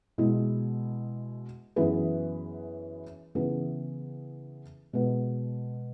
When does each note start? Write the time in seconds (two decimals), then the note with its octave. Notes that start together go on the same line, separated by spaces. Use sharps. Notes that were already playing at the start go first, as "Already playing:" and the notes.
0.18 B2 G#3 E4
1.76 F#2 E3 B3 G#4 B4
3.35 C#3 E3 B3 G#4
4.93 B2 G#3 B3